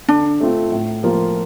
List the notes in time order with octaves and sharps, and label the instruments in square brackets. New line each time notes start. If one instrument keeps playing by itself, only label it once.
[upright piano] D3 [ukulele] D4
[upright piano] A3 C4 F4
A2
F3 A#3 F4